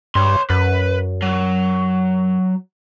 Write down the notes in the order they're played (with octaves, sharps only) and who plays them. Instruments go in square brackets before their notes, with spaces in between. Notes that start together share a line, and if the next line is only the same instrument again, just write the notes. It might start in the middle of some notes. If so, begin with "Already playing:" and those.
[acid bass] G2 [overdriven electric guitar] C#5 C6
[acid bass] F#2 [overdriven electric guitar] B4
[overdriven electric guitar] F#3